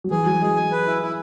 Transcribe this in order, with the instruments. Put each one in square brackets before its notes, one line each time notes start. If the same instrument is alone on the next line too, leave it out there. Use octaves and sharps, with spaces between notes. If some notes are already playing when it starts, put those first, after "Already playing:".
[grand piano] F#3
[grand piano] E3 [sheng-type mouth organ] G#4
[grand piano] F#3 [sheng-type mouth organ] G#5
[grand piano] G#3 [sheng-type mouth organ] G#4
[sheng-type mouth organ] G#5
B4
E4
E4